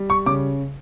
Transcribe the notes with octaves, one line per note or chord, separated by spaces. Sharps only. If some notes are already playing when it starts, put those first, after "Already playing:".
Already playing: G3
C#6
C#3 D6